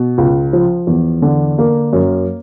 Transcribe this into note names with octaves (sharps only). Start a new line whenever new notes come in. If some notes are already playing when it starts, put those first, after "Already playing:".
Already playing: B2
C#2
F3
E2
D3
A#3
F#2